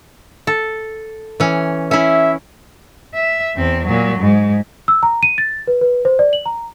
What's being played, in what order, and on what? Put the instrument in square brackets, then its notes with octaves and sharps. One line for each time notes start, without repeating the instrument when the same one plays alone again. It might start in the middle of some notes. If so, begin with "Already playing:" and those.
[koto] A4
E3 C#4
[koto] C#4 E4 [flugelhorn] E5
[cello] E5
E2 C4
A#2 F#3
G#2
[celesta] E6
A#5
D#7
A6
B4
B4
C5
D5
F#7
A#5